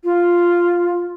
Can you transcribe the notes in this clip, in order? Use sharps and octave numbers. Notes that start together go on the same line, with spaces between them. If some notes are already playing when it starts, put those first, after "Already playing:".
F4